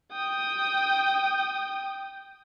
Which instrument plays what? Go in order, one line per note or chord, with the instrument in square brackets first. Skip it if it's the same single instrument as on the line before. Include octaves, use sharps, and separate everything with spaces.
[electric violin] G5 D#6